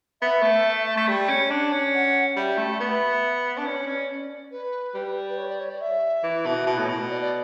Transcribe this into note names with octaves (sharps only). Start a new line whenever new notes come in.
B3 E5
A3
A3
G3
C#4
D4
C#4
F#5
G3 E5
A3
B3 E5
D4
C#4 D5
C#4
B4
G3
B4
C#5
D5
C#5
D5
E5
E3
B2
B2
A2
B2
D5
D5